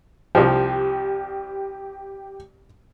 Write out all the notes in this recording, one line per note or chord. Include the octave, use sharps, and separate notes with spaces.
C2 F3 G4